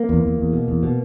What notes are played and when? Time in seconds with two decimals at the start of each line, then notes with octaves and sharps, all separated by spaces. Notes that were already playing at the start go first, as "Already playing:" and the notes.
Already playing: A#3
0.09 E2
0.23 E2
0.39 E2
0.53 B2
0.68 E2
0.83 B2